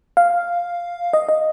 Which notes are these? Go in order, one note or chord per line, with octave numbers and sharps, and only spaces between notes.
F5
D#5
D#5